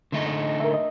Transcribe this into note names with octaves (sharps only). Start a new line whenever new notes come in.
D3 A3 D#4
D#5
A#4 E5
D#5